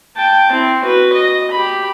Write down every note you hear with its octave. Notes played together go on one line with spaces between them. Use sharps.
G5 A5
C4 E4
F#4 B4
D#5
G4 B5